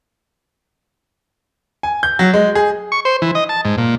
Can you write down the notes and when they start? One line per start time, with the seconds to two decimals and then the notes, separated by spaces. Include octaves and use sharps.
1.83 G#5
2.03 G6
2.19 F#3
2.34 G#3
2.55 G#4
2.92 C#6
3.05 C5
3.22 E3
3.35 D#5
3.49 A5
3.65 G#2
3.78 A#2